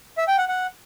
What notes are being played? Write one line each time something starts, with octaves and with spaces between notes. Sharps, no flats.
E5
G5
F#5
F#5